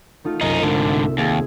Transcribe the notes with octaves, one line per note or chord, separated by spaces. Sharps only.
A3 D#4 F4
C2 F#2 D#4
G#2 D3
E5
D#2 G#4